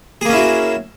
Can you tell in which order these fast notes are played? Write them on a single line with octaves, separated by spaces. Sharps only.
G#4 A#3 C#4 E4 F#4